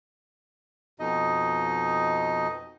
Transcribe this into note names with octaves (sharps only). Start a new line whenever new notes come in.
F2 B2 D#4 D#5